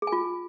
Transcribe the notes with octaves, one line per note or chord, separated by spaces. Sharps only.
G#4
G#5
F4